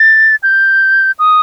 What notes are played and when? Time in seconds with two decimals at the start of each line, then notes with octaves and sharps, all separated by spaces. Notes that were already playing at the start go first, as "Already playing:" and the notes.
Already playing: A6
0.43 G6
1.19 D#6